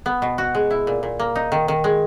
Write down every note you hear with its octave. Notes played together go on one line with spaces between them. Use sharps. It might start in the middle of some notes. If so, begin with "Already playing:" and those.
B3
B2
F#4
G#3
E4
A#2
A#2
A#3
D#4
D#3
D#3
G#3